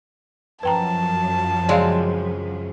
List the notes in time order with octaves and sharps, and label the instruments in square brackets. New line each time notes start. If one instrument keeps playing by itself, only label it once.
[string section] F#2 F3 F#3 [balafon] B4 G5 A#5 [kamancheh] A5
[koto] C#3 G#3 C4 [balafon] D5 F5